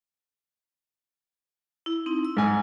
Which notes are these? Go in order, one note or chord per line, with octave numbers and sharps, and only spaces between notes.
E4
C4 D#4
E6
G#2 G#5